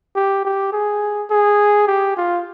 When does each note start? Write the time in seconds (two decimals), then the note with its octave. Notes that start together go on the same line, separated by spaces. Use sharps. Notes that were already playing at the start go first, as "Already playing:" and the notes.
0.15 G4
0.45 G4
0.72 G#4
1.30 G#4
1.87 G4
2.17 F4